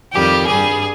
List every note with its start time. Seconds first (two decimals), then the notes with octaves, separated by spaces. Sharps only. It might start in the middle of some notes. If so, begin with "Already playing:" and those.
0.13 F2 D#3 G3 G4
0.48 G2 G3 G#4